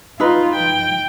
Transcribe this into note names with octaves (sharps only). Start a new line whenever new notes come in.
D#4 F4 B4
G5